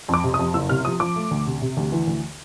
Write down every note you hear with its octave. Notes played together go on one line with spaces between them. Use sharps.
F2
D6
C3
D#6
F2
F#1 E6
C3 F6
F3 D#6
F3 D6
A3
D2
C3
C3
D2
E3
D2